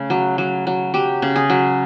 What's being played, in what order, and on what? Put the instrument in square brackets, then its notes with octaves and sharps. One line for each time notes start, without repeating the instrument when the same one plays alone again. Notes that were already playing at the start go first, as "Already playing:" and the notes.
Already playing: [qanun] C#3 A3
F#3
F#3
F#3
F#3 G4
C#3
G#4
F#3